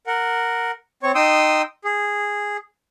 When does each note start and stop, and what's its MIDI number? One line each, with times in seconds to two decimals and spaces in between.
0.07 0.71 70
0.07 0.71 78
1.03 1.12 60
1.03 1.12 73
1.03 1.12 85
1.15 1.62 63
1.15 1.62 79
1.15 1.62 84
1.15 1.62 87
1.15 1.62 88
1.85 2.57 68